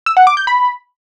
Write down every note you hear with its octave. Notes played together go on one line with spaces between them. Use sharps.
E6
F#5
D6
G6
B5